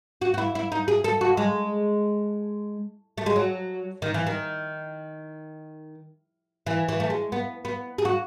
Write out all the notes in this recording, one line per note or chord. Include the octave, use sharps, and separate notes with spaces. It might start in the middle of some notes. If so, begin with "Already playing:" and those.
F#4
F#4
E4
E4
D#4
G#4
A4
F#4
G#3
A3
G#3
F#3
D#3
E3
D#3
E3
E3
A3
G#3
B3
B3
G#4
F#4